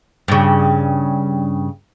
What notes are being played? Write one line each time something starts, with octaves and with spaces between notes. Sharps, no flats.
G2 C#3